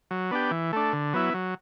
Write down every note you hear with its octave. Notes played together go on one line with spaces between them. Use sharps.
F#3
B3 D4 G4
E3
A3 D4
D3
F#3 B3 E4
F#3